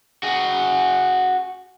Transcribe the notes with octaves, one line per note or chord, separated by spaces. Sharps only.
F#4 G#4